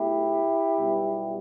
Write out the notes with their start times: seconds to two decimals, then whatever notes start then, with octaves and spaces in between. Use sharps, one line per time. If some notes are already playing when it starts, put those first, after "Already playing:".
Already playing: B1 B2 A3 E4 G4
0.78 B1 B2 G3 B3